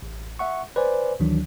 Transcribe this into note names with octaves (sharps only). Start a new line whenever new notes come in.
A1
E5 F#5 C#6
B4 C5 D5 G#5
D2 D#3 E3 F#3 D4